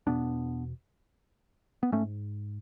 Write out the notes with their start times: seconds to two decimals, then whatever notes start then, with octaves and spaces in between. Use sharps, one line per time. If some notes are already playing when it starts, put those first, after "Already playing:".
0.07 E2 B2 B3 D4
1.83 B3
1.92 G#2 A3 C#4